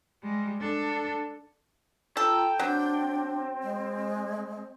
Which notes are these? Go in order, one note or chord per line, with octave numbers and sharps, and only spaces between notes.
G3 G#3
D4 A4
F4 A4 G5 A#5
F#3 C4 D4
G#3